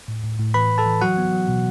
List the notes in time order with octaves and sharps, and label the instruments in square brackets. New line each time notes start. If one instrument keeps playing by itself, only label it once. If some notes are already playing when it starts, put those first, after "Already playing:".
[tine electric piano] A2
A2
A2
E3 B4 B5
A2
A4 A5
E3
F#3 F#4 F#5
B3
F#3
B2